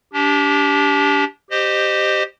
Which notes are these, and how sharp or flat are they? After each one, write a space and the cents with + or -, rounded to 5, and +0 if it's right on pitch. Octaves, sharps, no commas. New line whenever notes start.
D4 -30 G4 +0
G4 +0 C5 -10 D#5 -25